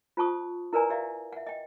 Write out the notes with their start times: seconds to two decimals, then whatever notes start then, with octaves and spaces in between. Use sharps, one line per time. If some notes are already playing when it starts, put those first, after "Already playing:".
0.17 F4 C5 A5 C#6 D#6
0.73 E4 A#4 B4 D5 G#5 A#5
0.90 G4 D5 E5 F5
1.32 E5 F#5
1.47 D#5 G5